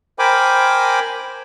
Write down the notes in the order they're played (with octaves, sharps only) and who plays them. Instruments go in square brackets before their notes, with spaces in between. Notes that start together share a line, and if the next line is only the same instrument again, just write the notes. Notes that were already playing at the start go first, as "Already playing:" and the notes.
[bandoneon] A#4 C5 G5 G#5 B5 D6